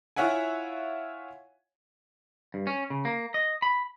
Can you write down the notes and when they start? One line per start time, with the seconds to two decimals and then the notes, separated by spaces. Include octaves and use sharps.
0.16 E4 F4 C#5 E5 F#5 G#5
2.54 G2
2.67 C#4
2.90 C#3
3.05 A#3
3.34 D#5
3.62 B5